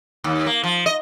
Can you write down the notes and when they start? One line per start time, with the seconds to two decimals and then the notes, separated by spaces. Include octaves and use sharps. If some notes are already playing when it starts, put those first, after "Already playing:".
0.24 D#2
0.46 A#3
0.64 F3
0.86 D#5